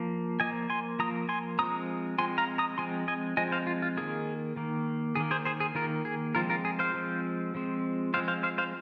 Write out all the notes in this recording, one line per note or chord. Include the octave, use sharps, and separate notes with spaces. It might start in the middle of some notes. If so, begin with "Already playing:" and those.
Already playing: F3 A#3
F3 A#3 D#5 G#5
G#5 C6
F3 A#3 A#5 D#6
G#5 C6
F3 G#3 C4 A#5 D#6
F3 G#3 C4 G#5 C6
F5 A#5
A#5 D#6
F3 G#3 C4 G#5 C6
D#5 G#5
F3 G#3 C4 D#5 G#5
C5 F5
F4
F4
D#3 A#3 G#4
D#3 A#3
D#3 A#3 G#4
G#4 C5
G#4 C5
G#4
D#3 A#3 F4 A#4
G#4
F3 G#3 C4 F4 A#4
F4 A#4
G#4
C5 F5
F3 G#3 C4
F3 G#3 C4
F3 G#3 C4 C5 F5
C5 F5
C5 F5
C5 F5